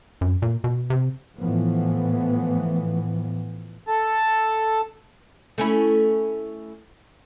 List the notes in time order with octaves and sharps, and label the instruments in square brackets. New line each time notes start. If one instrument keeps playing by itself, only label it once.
[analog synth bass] F#2
A#2
B2
C3
[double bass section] A2 E3 F3 B3
[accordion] A4 A5
[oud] A3 C#4 E4